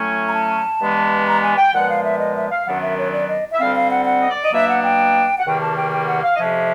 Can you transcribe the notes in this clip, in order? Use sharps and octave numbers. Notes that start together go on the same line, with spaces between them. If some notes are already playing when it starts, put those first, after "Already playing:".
Already playing: A2 F#3 A3 C#4 G#5
A#5
A5
G2 E3 G#3 B3
A#5
G#5
G5
A#2 F3 G#3 B3 F#5
F5
E5
D#5
E5
F5
F#2 D#3 F#3 B3 D4 F#5
E5
C#5
D5
D#5
E5
D2 D3 G3 C4 F5
F5
F#5
F#5
D#5
D5
D#5
B2 F#3 A#3 D4 E5
F#5
G5
F#5
E2 C3 D#3 G3 A#3 G5
A5
G5
G5
F#5
F5
D#5
F2 C3 F3 G#3 C#4 E5